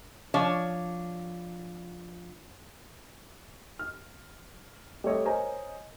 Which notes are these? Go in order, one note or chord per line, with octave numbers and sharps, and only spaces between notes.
F3 D4 C#5
F6
G3 A3 C#5 D#5
A#4 C5 C#5 D#5 G#5 A#5